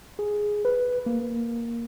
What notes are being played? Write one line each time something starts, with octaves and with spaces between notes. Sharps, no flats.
G#4
B4
A#3